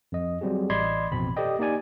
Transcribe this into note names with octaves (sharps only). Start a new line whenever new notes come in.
F2 D#5
F#3 G3 C4 F#4 G#4
A1 D5 D#5 B5 C6 G#6
A1 F2 B2 C4 B5
G4 A4 C5 D5 D#5 G5
A#3 D#4 G4 D5 G#5